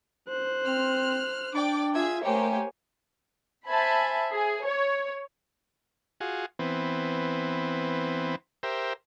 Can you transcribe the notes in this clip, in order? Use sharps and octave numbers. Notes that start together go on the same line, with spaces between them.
C5 F#6
C4 F6
D4 D5 G5 D6
F4 G#4 E5 G#6
A3 A#3 G4 C5 C#5 G#5
C5 E5 G#5 A5 B5
G#4
C#5
F4 F#4 G#4
E3 B3 C4
G4 A#4 C5 E5